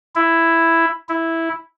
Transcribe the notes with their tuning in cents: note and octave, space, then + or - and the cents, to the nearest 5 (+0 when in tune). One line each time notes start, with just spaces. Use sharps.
E4 +5
E4 -5